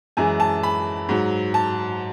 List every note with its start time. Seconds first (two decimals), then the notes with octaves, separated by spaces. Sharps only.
0.17 F#2 E3 G#3 G#5
0.40 A5
0.63 B5
1.09 G#2 F#3
1.54 A5